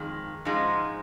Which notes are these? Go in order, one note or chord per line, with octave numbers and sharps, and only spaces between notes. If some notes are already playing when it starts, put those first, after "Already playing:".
Already playing: F2 D#3 G#3
G#2 F3 G#3 D#4